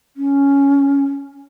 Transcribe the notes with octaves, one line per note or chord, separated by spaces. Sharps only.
C#4